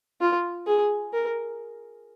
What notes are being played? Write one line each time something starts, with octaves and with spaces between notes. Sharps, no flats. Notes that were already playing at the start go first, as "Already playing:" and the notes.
F4
G#4
A#4